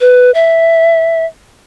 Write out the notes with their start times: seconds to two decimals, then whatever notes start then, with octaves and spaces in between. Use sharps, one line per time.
0.01 B4
0.34 E5